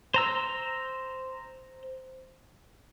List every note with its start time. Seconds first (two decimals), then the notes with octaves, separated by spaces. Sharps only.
0.14 C5 A#5 E6